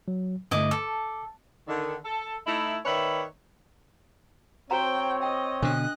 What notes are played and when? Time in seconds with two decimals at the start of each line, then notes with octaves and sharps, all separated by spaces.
0.08 F#3
0.51 G2 D3 A3 E4 D#5 D6
0.71 A4 D6
1.68 D3 D#3
2.05 A4
2.47 A3 D#4 E4
2.86 D#3 B4 C#5 D5 E5
4.71 C4 F#4 C5 C#5 G5 A#5
5.23 D#5 G5
5.62 B2 D3 D4 A4 D#5 F#6